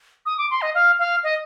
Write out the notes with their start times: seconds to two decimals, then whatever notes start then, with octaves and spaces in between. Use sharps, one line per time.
0.26 D#6
0.38 D6
0.50 C6
0.62 D#5
0.75 F5
0.99 F5
1.23 D#5